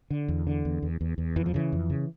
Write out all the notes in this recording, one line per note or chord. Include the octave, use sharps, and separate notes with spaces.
D3
E2
D3
E2
E2
E2
E2
F2 E3
F3
C#3 E3
F2
C#3